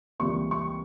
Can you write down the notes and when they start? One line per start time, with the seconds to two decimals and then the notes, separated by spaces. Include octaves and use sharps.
0.20 C#2 C3 E3 G3 A#3 C#6
0.51 C#6